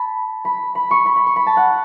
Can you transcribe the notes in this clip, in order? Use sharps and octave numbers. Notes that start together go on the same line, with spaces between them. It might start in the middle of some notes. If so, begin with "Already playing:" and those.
Already playing: A5 B5
B5
B5
C#6
B5
B5
C#6
B5
A5
F#5